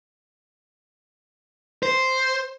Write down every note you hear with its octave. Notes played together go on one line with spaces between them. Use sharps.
C5